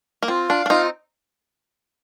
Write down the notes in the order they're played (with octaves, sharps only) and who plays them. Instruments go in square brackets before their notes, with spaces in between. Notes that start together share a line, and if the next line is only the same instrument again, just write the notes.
[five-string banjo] A#3
[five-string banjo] C4 [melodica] F4
[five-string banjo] D4 [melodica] F5
[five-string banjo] D4
[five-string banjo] C4 D#4 [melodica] F4